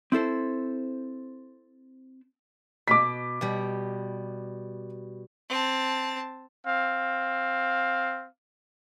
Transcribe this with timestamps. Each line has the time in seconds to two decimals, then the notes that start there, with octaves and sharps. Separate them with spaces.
0.12 C4 E4 A4 C5
2.88 B2 D6 B6
3.41 B2 G3
5.49 C4 A5
6.66 C4 F5